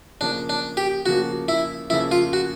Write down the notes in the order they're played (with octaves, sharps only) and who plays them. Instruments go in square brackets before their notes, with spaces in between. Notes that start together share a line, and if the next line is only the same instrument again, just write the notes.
[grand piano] C#3 F3 A#3 [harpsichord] D4
[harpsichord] D4
G4
[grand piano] C#3 F3 A#3 [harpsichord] F#4
[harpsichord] E4
[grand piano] C#3 F3 A#3 [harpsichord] E4
[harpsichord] F4
F#4